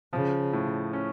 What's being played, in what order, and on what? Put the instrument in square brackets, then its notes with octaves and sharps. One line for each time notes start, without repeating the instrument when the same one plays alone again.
[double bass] C#3 [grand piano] F3
[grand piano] A2
C#4